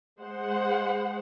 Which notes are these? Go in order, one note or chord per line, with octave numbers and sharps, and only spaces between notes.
G#3 C5 F#5